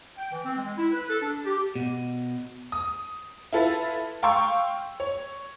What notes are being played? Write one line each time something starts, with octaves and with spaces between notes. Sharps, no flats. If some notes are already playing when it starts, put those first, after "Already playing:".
G5
E3
C4
G#3
E4
B4
A4
D4
G4
B2
D#6
E4 F4 A4 B4
F5 G5 C6 C#6 E6
C#5